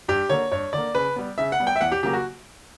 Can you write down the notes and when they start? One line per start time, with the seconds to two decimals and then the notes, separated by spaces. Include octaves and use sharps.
0.08 G2 G4
0.29 D3 A#3 C#5
0.51 G2 C#5
0.73 D3 A#3 D5
0.95 C#3 B4
1.16 G3 B3
1.38 C#3 E5
1.52 F#5
1.59 G3 B3
1.67 G5
1.76 E5
1.81 E2 F#5
1.92 G4
2.03 C#3 F#3 A#3 G4
2.13 F#4